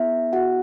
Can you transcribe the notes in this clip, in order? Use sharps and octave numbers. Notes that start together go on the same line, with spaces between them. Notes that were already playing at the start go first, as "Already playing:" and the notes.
Already playing: B3 E4 G#4 E5
F#4 F#5